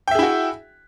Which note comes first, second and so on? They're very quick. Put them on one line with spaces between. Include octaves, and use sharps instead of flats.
G5 E5 G#4 E4 F#4